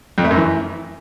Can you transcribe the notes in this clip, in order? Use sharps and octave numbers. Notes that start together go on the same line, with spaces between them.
F2
A3
F#2
E3